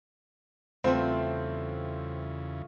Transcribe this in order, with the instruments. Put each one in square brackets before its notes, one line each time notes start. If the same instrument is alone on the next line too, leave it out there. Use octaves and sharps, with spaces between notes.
[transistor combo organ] E2 C#3 [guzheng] G3 A3 [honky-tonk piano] C4 [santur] F4 B4